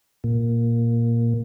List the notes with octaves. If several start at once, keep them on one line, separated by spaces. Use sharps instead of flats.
A#2